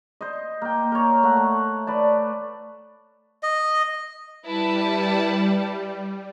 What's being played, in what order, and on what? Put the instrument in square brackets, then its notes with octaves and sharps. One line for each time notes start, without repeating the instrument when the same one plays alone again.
[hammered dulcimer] C5 D#5
A#3 G5
A#4 C#5
A3 F#5
A3
B4 D5 A5
[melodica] D#5
[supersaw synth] G3 [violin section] E4 B4 A5